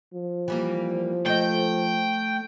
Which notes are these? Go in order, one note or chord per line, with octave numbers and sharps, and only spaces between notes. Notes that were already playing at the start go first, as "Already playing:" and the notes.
F3
E3 G3 A#3
A3 D#5 G5